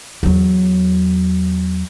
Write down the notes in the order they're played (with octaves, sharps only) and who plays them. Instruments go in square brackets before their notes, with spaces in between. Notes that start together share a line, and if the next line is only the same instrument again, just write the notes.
[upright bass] E2 F#3